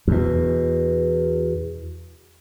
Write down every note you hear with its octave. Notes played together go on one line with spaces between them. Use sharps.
E2 B2